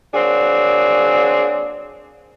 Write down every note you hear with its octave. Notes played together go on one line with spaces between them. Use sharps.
F#3 A#3 C4 D4 G#4